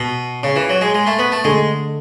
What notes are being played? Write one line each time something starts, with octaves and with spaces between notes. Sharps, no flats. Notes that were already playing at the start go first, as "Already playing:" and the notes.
Already playing: B2
C#3
E3
F#3
G#3
G#3
A3
B3
A3
D3 G#3 A3